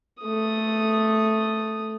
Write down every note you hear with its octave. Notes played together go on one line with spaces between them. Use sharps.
A3 D#6